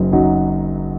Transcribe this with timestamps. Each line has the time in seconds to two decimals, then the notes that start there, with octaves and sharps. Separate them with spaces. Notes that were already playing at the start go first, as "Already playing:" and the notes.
Already playing: F#1 F#2 F#3 D#4
0.12 F#1 F#2 F#3 D#4